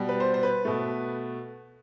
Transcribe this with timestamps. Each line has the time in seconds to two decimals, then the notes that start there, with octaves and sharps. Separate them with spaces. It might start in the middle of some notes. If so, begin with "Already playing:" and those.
Already playing: B2 G3
0.09 B4
0.20 C5
0.34 C5
0.43 B4
0.65 B2 A3